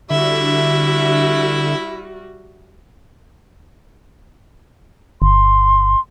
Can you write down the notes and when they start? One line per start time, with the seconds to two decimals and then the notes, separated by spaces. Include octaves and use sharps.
0.10 D3 G3 E4 F#4 E5
5.22 G1 C6